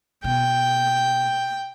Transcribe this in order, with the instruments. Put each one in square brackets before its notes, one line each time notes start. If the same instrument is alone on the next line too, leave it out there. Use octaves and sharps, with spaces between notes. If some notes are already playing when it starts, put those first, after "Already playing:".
[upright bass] B2 [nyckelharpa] G5